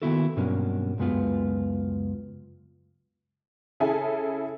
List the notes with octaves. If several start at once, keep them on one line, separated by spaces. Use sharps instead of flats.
D#3 A#3 B3 E4 F#4 A4
G2 B2 F#3 A#3 C#4 D4
C#2 F#2 G#3 B3 F4
C#3 E4 G#4 A4 E5 G#5